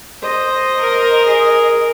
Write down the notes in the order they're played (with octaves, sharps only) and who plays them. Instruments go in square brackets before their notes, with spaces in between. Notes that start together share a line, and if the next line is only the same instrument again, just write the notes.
[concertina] C5 [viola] D#5
[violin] A#4
[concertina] G#4